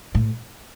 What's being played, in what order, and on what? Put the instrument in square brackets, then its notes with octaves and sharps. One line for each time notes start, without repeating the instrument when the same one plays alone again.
[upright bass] A2